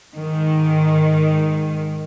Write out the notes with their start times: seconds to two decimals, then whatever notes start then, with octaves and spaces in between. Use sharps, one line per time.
0.13 G#2 D#3